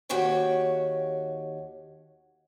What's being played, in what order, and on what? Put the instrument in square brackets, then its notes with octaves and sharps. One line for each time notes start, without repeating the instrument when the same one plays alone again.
[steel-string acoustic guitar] D#2 F#4 G4 C#5 G5